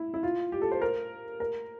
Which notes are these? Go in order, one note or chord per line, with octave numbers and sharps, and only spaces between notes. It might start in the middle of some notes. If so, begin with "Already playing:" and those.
Already playing: E4
E4
F4
G4
A4
C5
A#4
A#4